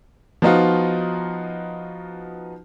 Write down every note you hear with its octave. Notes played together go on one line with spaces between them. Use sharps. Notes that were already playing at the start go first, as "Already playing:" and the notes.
F3 B3 D#4 F4 F#4